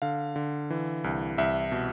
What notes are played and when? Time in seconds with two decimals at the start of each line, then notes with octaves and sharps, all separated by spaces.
0.02 D3 F5
0.36 D3
0.70 E3
1.04 C2
1.38 C2 E5
1.72 B2